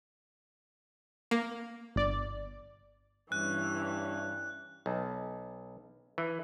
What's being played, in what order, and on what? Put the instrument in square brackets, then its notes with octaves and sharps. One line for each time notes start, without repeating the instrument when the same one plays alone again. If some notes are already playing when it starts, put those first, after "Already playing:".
[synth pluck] A#3
[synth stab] G1 D5
[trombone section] G2 [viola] E3 [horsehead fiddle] C#4 [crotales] F#6
[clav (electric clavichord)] B1
E3